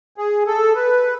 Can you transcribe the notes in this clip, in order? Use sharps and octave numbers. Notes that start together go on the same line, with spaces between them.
G#4
A4
B4